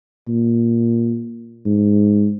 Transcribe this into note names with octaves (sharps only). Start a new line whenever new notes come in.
A#2
G#2